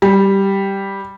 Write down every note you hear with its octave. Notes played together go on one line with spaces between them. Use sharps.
G3